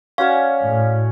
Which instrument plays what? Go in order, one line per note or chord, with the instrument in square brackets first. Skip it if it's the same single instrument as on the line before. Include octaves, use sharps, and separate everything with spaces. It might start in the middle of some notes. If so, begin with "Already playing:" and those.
[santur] C#4 F#4 C#5 [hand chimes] D5 F5
[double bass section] A2